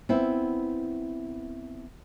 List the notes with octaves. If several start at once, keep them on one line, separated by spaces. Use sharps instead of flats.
B3 C4 E4